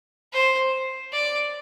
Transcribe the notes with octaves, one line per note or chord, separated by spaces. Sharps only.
C5
D5